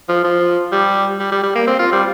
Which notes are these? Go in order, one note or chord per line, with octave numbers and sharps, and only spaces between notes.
F3
F3
G3
G3
G3
G3
A#3
C4
F4
G3